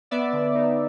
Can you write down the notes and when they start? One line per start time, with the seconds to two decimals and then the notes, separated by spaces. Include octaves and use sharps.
0.11 B3 D5 E5
0.33 D3
0.55 D#4